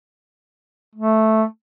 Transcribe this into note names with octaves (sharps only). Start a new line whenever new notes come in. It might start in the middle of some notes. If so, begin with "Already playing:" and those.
A3